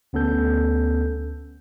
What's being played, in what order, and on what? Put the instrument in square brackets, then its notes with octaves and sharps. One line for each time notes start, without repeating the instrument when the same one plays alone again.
[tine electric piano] D2 B3 C#4 A4 G6